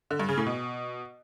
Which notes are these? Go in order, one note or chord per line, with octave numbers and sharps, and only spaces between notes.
D3
G2
C#3
A2
B2